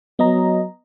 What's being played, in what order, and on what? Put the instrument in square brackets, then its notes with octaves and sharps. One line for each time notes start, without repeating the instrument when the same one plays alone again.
[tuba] F#3 [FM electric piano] B3 D#5 A#5